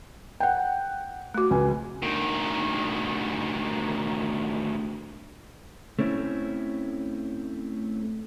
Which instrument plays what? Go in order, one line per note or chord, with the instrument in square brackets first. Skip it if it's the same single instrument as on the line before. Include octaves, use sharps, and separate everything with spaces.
[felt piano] F#5 G5
[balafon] A3 F#4
[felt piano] C#2 G#5
[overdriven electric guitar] D2 D#3
[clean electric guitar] A3 C4 C#4 E4